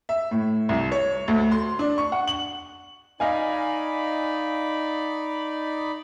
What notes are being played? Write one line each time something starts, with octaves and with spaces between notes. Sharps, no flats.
E5
A2
C2
C#5
D2
C6
D4
C#6
F#5
F#7
D#4 D5 D#5 F5 G#5 B5